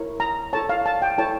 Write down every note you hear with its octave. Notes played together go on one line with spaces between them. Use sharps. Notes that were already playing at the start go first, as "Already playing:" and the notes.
Already playing: E4 A#4 C#5
A#5
E4 A4 C#5 A5
F5
A5
G5
E4 A4 C#5 A5